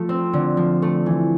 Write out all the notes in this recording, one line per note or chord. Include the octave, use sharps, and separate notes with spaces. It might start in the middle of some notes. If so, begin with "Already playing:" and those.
Already playing: F3 A3
C4
D3
F3
A3
E3